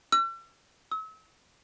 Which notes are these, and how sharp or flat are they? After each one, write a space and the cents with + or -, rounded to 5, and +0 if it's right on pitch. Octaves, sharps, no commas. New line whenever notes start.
E6 +40
E6 -40